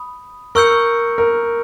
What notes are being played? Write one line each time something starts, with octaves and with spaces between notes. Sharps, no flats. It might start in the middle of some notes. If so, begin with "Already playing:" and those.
Already playing: B5 D#6
A#4 C#6 E6 G6 C#7
A#4